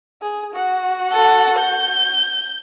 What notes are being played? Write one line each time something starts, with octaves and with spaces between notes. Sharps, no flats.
G#4
F#4 F#5
A4
G6